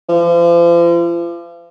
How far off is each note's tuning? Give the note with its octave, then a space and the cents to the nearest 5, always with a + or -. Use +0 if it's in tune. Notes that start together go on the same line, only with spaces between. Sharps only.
F3 -40